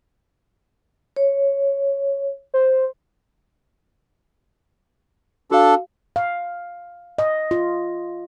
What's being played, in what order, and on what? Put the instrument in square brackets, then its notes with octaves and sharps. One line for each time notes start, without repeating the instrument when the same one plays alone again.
[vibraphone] C#5
[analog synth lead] C5
[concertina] D4 A4 [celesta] F#4 F5
[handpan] F5
D#5
F4